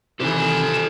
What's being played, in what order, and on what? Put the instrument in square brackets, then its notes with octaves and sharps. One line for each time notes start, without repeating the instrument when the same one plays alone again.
[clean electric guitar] C3 D#3 E3 [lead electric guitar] G4 G#5 [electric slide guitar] A4 C5 [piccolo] E7